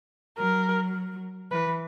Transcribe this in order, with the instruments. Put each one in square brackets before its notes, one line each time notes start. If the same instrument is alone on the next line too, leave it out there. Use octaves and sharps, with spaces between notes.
[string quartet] F#3 [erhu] A#4
[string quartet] E3 [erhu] B4